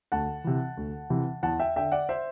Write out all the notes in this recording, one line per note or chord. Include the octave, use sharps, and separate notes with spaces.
D2 F#5 A5
C3 E3
D2
C3 E3
E2 F#5 A5
E5 G5
D3 E5 G5
D5 F#5
C5 E5